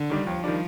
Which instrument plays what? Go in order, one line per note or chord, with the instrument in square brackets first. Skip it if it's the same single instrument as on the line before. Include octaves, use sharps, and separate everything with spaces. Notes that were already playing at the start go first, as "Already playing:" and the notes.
Already playing: [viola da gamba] D3
[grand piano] D#3 G3 D4
[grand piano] D#2 [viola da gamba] F3
[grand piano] D#3 G3 D4